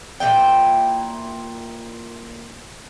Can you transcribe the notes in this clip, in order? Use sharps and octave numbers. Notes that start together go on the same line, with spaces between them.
A#2 G3 E4 G5